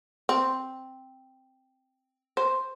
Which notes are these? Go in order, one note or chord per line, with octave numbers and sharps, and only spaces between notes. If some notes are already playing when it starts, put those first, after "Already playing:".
C4
C5